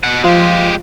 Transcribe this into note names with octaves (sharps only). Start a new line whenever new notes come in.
B2 F#5
F3 G#3 F4 G4